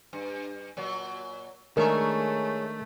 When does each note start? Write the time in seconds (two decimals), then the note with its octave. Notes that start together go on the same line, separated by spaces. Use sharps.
0.13 G2
0.77 A#2 F#3
1.77 D#3 G#3 A3 D4 G#4 A#4 C#5 E5